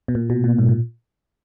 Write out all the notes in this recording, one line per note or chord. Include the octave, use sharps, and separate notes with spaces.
B2
A#2
B2
A#2
G#2
A#2